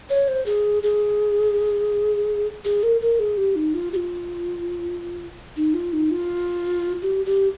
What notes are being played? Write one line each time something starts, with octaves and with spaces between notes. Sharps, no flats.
C#5
C5
G#4
G#4
G#4
A#4
A#4
G#4
G4
D#4
F4
G4
F4
D#4
F4
D#4
F4
G4
G4